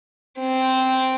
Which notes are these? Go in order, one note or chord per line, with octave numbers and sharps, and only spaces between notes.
C4